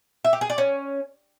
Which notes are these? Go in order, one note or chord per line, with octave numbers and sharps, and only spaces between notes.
E5
G4
G#4
D5
C#4